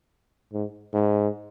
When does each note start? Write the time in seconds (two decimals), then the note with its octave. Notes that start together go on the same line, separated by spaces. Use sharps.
0.53 G#2
0.93 G#2